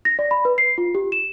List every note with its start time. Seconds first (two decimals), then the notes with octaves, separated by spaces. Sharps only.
0.05 A#6
0.19 D5
0.31 B5
0.45 B4
0.58 C7
0.78 F4
0.95 G4
1.12 E7